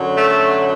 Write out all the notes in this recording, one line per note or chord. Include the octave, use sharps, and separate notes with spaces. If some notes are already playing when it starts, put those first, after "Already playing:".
Already playing: F#2 D3 F#3
A3